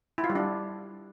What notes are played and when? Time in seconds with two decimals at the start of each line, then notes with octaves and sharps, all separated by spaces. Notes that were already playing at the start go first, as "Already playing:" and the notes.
0.18 E4
0.24 F4
0.30 G3
0.35 D4